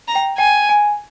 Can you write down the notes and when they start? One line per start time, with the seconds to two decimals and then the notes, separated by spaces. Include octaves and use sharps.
0.08 A#5
0.15 G5
0.38 G5 G#5
0.69 G#5